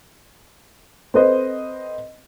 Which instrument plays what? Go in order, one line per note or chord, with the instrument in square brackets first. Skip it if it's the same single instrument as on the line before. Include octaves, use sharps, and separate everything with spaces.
[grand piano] C4 A4 B4 C5 D#5